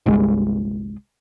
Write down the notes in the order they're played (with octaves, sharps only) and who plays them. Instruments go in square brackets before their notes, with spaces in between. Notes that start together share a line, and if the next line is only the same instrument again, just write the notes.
[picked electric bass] G1 C2 G#3